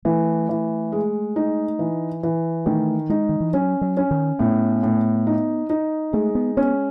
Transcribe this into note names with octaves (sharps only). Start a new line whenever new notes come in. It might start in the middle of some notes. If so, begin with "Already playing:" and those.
E3 A3
E3
G#3
D#4
E3
E3
D#3 A3
G#3 D#4
D#3
E3
F#3 C#4
F#3
C#4
D#3
A2 B3
A2
D#4
D#4
G#3 A3
B3
B3 C#4